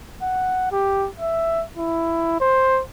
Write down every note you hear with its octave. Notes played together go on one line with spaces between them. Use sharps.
F#5
G4
E5
E4
C5